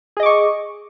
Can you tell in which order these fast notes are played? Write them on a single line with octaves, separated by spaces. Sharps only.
G#4 D#5 D6 C#6